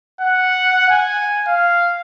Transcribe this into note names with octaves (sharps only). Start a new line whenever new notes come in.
F#5
G#5
F5